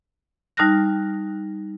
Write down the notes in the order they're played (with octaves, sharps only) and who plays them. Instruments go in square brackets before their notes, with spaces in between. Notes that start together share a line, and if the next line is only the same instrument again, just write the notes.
[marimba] G3 D#4 A5 F6 F#6 A#6